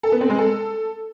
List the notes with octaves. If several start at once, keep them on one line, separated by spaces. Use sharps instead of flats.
A4
B3
C4
G#3
A4